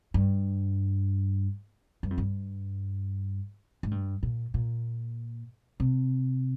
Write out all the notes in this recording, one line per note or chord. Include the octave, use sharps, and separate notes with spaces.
G2
G2
F2
G2
G#2
G2
A#2
A#2
C3